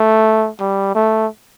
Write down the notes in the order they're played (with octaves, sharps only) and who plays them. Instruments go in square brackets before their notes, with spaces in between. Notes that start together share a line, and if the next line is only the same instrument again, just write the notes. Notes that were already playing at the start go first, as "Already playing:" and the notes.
Already playing: [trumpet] A3
G3
A3